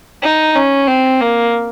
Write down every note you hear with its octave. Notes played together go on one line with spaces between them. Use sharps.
D#4
C#4
C4
A#3